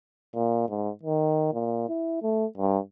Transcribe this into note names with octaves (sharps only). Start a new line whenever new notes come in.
A#2
G#2
D#3
A#2
E4
A3
G2